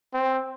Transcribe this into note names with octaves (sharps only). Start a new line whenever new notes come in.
C4